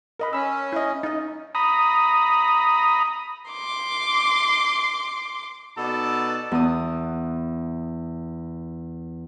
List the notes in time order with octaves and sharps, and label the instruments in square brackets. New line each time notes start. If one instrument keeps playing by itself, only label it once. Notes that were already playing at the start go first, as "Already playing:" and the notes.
[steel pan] A#4 D#5 B5
[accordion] C#4 [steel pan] B5 E6
[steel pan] E4 D#5
D#4 D#5
[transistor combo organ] A#5 B5 D#6
[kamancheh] C6 D6
[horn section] B2 B3 D#4 A4 D5 A5
[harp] E2 D#6